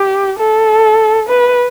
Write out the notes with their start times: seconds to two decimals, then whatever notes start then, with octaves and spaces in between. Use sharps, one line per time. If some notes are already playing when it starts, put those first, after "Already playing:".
Already playing: G4
0.39 A4
1.29 B4